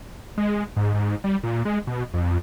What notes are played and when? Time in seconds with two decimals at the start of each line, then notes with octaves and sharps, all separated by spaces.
0.38 G#3
0.76 G#2
0.94 G#2
1.24 G3
1.43 A#2
1.65 G#3
1.87 B2
2.14 F2